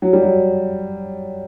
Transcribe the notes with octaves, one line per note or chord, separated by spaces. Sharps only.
F#3
G3
F#3